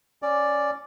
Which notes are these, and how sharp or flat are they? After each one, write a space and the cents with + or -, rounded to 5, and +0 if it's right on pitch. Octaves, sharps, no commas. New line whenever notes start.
C#4 +0 D5 +0